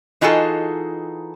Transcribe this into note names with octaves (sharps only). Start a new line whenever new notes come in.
E3 D#4 F4 F#4 G#4 A4